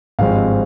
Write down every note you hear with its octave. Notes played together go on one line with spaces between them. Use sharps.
G#1 G2 F3 G#3 C4 F5